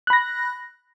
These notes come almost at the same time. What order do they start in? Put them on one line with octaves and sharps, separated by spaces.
F#6 B5 A#6